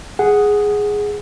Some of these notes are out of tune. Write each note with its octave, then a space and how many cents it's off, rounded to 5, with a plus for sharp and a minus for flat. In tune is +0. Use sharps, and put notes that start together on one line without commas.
G#4 +0 F#5 +0